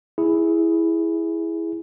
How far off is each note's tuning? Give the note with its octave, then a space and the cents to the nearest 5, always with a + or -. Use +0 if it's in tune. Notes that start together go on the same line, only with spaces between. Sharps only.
E4 +0 G#4 +0